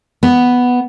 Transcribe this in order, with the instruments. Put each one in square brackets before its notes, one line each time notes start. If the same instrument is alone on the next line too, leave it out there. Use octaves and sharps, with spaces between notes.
[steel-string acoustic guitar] B3